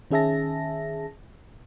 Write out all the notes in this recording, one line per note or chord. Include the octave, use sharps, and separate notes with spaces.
D#3 C#4 G#4 E5 A5 A#6